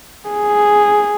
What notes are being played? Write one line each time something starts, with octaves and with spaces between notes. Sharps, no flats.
G#4